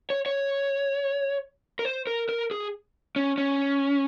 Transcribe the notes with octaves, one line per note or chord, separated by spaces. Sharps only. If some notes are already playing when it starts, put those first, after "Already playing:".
C#5
C#5
A#4
C5
A#4
A#4
G#4
C#4
C#4